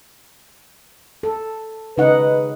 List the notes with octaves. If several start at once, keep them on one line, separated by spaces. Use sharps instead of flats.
A4
C#3 D#4 B4 F#5